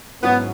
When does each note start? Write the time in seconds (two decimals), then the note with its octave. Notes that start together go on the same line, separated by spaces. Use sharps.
0.22 G#2 F#3 B3 C#4 E4